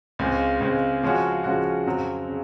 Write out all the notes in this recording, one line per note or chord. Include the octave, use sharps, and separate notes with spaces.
C#2 C#3 G#3 C4
C#2 C#3 G#3 C4
C#3 F3 G#3 C#4 F#4
C#3 F3 G#3 C#4 F#4
F2 C#3 F#3 C4
C#3